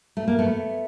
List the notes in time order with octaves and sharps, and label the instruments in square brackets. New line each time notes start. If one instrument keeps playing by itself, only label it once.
[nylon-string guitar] A3
A#3
A3 B3